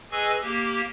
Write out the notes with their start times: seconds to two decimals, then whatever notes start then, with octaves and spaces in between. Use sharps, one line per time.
0.12 G#4 B4 D#5 G#5 C#6 E6
0.42 A#3 G4